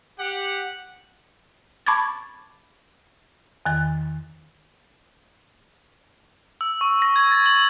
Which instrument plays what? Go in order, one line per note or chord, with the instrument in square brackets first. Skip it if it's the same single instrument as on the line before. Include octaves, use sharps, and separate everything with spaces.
[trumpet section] G4 F#5
[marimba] A5 B5 C#6 D6 G#6 A6
E2 D#3 A6
[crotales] E6
C#6
A#6
G#6
A6
F#7